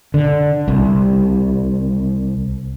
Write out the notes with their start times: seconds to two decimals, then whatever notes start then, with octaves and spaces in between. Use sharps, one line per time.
0.14 D3
0.68 C2